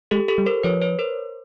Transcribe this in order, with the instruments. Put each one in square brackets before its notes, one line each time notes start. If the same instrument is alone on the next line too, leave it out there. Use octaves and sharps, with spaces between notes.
[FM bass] G#3 [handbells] G4 A4
[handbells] G4 A4
[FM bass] G3
[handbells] A#4 C5
[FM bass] F3 [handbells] B4 C#5
[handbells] B4 C#5
A#4 C5